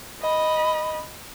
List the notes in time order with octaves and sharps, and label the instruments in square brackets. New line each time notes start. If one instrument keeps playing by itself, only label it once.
[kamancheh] D#5 B5